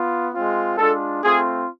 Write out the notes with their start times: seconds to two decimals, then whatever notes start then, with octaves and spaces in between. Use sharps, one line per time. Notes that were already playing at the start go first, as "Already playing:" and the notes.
Already playing: B3 F4
0.34 G#3 C4 F4
0.78 G#3 D4 F4 A4
1.23 A3 C4 F4 G#4